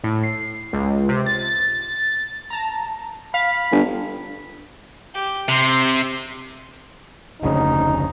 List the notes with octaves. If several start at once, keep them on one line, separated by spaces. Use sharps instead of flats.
A2
C7
C#2
C3
A6
A5 A#5
F5 B5
G1
G4
C3 C6
F1 D2 C#3 D#4